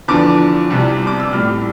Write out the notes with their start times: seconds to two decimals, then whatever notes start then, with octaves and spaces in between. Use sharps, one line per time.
0.08 E2 D3 F3 D6
0.70 C2 C3 G3
1.07 D6
1.20 E6
1.33 A2 G3 F6